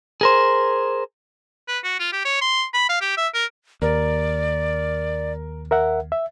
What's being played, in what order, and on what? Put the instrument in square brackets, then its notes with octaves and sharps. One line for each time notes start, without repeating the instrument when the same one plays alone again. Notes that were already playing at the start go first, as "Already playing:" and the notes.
[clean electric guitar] G#4 A#4 C5
[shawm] B4
F#4
F4
G4
C#5
C6
B5
F5
G4
E5
A#4
[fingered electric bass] D#2 [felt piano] A#4 [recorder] D5
[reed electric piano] A#4 E5 F#5
E5